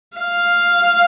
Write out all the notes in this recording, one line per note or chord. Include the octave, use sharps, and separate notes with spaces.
F5